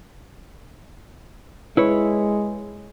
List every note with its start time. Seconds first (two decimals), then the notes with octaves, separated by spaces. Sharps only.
1.77 G#3 E4 B4 C#5